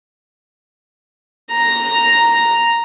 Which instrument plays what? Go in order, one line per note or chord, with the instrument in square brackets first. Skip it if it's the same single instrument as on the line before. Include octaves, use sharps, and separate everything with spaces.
[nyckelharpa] A#5